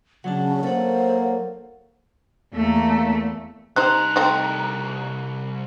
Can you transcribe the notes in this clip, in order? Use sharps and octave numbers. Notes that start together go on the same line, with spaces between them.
C#3 F#3 D4 F#5 A5
A#3 A4 C5 C#5 F#5
E2 A3 A#3
C2 G3 D#4 C5 A#5 F#6
A3 C4 D#4